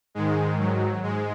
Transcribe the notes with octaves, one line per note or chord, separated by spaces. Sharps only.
G#2 D#3 G#3
F#3
G#2 G#3